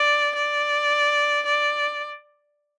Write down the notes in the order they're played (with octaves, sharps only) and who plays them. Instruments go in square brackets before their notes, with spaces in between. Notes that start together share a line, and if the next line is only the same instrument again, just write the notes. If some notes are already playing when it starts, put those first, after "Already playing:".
Already playing: [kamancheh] D5
D5
D5